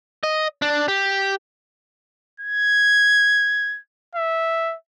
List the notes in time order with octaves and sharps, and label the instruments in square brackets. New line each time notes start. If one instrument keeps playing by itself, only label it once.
[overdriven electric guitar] D#5
D4
G4
[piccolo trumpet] G#6
E5